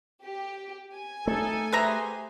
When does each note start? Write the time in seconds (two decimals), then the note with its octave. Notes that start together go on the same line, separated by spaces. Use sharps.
0.23 G4
0.95 G#5
1.27 A3 D#4 A4
1.72 G4 G#4 B4 C5 E5 A#5